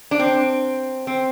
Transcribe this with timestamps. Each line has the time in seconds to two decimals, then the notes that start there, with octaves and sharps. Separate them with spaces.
0.11 D4
0.19 C4
1.07 C4